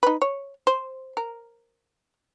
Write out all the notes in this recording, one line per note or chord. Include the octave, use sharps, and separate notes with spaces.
D#4 B4
C#5
C5
A#4